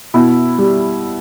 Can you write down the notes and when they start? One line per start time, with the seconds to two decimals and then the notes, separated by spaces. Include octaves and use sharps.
0.14 B2 E4
0.58 G3